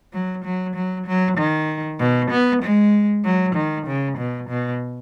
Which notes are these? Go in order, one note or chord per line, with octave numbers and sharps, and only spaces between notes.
F#3
F#3
F#3
F#3
D#3
B2
B3
G#3
F#3
D#3
C#3
B2
B2